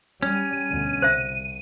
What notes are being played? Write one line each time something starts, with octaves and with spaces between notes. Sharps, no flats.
G3 C#4 D#7
D2 B2 D3
C2 C5 E5